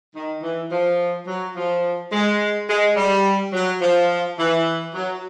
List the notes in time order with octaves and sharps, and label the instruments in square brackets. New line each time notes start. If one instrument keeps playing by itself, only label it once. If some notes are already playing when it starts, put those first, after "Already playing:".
[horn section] D#3
E3
F3
F#3
F3
G#3
G#3
G3
F#3
F3
E3
F#3